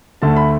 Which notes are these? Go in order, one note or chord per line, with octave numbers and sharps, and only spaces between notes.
D2 D3 A3 A5
B5